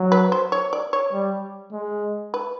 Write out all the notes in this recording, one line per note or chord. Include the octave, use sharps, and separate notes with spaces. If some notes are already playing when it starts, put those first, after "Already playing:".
Already playing: F#3
B4
C5
C#5
D5
C#5
G3
G#3
B4